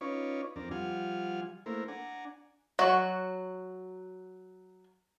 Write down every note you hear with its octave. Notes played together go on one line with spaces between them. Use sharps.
C#4 D#4 F4 B4 C#5 D5
F2 C4 D4 A#4
F3 G3 F4 F#5 G#5 F6
A3 A#3 E4 A#4 C5
D4 F#5 G#5 A#5
F#3 F#4